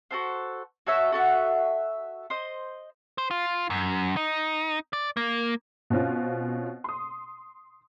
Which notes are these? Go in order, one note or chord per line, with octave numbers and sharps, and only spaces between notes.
F#4 A4 C5
F#4 A4 C#5 E5
F#4 A4 E5 F#5
C5 D#5
C5
F4
F#2
D#4
D5
A#3
B2 C4 C#4 F4
C6 D#6